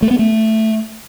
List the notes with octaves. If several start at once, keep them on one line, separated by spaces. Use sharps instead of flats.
A3
B3
A3